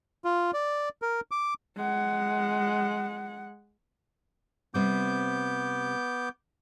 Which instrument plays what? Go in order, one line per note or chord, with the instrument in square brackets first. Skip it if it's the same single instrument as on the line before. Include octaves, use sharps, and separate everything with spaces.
[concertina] F4
D5
A#4
D6
[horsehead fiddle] G#3 F#5
[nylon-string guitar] C3 G3 C4 [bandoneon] B3 D6 G6